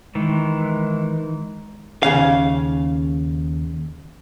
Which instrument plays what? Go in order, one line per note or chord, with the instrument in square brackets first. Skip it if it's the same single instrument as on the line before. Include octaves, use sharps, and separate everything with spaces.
[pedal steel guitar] D#3 E3 [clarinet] G#3
[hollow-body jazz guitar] D#2 C#3 F5